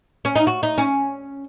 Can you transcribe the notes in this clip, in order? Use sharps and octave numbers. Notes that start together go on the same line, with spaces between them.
C#4
D#4
F#4
D#4
C#4